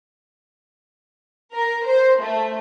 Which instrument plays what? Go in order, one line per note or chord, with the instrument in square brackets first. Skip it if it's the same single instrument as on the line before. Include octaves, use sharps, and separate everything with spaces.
[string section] A#4
C5
A3